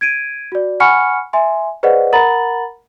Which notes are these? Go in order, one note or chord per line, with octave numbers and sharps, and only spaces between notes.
G#6 D7 D#7
F#4 D5
F#5 G#5 B5 C#6 F6 C#7
E5 G#5 C6
G#4 B4 C5 D5 D#5 F#5
A#4 F#5 A#5 B5 A6 F#7